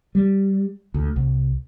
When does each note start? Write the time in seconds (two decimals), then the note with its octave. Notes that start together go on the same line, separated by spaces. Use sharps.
0.15 G3
0.94 D2
1.16 C2